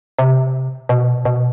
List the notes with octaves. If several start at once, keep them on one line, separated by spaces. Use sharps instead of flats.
C3
B2
B2